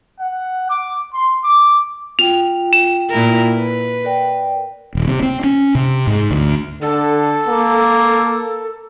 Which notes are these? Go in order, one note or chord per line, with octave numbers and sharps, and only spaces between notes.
F#5
D6
C6
D6
F4 G5 F7
E7
A#2 E4 A#4
B4
A#4 D5 G5
D#1
C3
C4
C#4
C3
G#2
D2
D3 A4
A#3